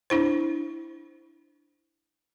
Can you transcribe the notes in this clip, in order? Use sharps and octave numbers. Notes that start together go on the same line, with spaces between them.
D4 E4 C5